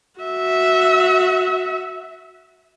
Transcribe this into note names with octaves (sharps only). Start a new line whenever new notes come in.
F#4 E5